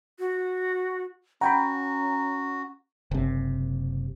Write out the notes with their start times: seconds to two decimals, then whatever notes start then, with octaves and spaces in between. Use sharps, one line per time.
0.19 F#4
1.41 C#4 F#4 F#5 G5 A#5 B5
3.11 F#1 C3